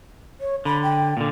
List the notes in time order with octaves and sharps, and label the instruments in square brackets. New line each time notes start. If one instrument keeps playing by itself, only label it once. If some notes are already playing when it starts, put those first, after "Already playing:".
[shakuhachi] C#5
[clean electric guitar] D3 [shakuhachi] B5
[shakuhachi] G5
[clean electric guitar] A#2 D3